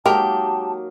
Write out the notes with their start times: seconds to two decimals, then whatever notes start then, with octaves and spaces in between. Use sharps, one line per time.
0.06 F#3 G#3 A#3 D#4 G4 A#4 A5